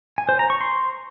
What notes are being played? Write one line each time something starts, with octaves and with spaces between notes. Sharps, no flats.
G#5
C5
A#5
C#6
C6